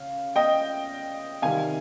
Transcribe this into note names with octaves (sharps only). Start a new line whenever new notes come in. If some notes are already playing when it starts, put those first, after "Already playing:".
Already playing: C#3 C#4 F5
D#5 G5
C3 D#3 G3 F5 G#5